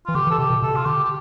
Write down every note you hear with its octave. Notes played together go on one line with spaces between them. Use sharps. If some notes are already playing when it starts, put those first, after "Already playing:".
E3 F4
D3 G4
E3
A4
C3 G4
B2
C3 A4
F4
D3 G4
G4